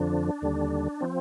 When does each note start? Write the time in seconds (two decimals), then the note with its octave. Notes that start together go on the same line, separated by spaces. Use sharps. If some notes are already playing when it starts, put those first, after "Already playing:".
Already playing: F2 D3 F3 D4
0.42 D#2 D3 G3
1.01 F3 C4